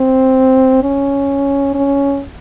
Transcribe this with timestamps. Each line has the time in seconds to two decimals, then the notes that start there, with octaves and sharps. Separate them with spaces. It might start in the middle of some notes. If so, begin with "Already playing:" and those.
Already playing: C4
0.83 C#4
1.74 C#4